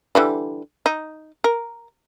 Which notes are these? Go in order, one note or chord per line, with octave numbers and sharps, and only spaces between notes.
D3 E3 G3
D#4
A#4